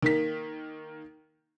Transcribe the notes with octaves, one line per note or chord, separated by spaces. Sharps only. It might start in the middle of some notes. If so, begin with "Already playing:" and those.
D#3 A#3 B6